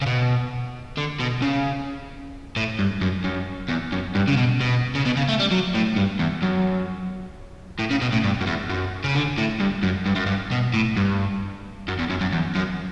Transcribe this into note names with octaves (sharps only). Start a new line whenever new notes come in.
C#3
B2
D3
B2
C#3
A2
G2
F#2
F#2
E2
F#2
G2
C#3
B2
B2
C#3
B2
C#3
A3
G3
F#3
A2
G2
E2
F#2
A2
C#3
B2
A2
G2
F#2
E2
F#2
C#3
D3
A2
G2
F#2
G2
F#2
G2
B2
A2
G2
F#2
E2
F#2
F#2
E2
F#2